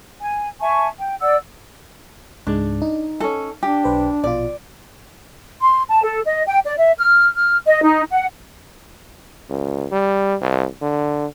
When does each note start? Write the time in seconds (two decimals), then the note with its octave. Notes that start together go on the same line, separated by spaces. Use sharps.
0.21 G#5
0.60 E5 G#5 A5 C#6
0.98 G5
1.21 D5 F#5 E6
2.47 C#2 G#2 G#3 D4
2.82 D#4
3.20 C#4 A4
3.63 D4 G4
3.84 B1 B4 C5
4.24 A#1 B2 F4 D5
5.61 C6
5.90 A5
6.04 A4
6.25 D#5
6.47 G5
6.65 D5
6.79 E5
6.98 F6
7.36 F6
7.66 D#5
7.83 D#4
8.11 F#5
9.50 C#2
9.92 G3
10.41 C2
10.82 D3